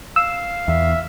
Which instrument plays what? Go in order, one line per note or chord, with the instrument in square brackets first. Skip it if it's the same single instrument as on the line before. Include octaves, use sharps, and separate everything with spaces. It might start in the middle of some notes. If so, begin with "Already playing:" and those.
[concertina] F5 [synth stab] E6
[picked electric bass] E2 [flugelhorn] E5